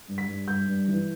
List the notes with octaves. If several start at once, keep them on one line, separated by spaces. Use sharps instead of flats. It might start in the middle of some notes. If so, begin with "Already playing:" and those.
G2
B6
G2
G2 G6
G2
E3